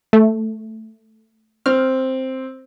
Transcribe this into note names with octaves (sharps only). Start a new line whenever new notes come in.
A3
C4 F6